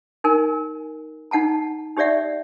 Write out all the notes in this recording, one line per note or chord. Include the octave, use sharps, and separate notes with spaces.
D#4 A#4 G#5
D#4 F#5 A5 A#5
D#4 G4 C#5 D5 E5 F#5